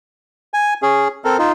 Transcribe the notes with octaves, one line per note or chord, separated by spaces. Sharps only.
G#5
C#4 G#4
C4 A4 A#4
D#4 F4